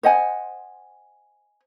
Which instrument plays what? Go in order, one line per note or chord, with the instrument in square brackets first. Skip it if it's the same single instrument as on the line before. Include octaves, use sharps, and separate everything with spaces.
[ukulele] C5 D#5 F#5 G#5